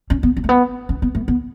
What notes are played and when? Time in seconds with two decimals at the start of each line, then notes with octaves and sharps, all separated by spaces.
0.10 C#4
0.23 B3
0.37 C#4
0.44 A3
0.49 B3
0.89 C#4
1.02 B3
1.15 A3
1.28 B3